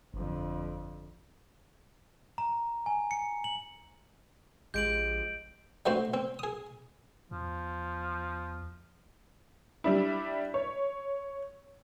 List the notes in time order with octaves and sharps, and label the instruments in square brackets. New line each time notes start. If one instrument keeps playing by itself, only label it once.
[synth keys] G1 [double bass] F2 D3
[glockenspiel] A#5
G#5
C#7
F#7
[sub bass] A#1 [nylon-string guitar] F3 G#3 G4 [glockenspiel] G6 D7 F#7
[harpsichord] G3 A3 C4 D4 F#4 C5
C4
G#4 D#6
[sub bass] E2 [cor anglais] F3
[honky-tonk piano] G3 D4 E4
C#5